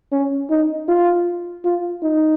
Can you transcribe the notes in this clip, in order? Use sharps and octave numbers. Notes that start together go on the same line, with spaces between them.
C#4
D#4
F4
F4
D#4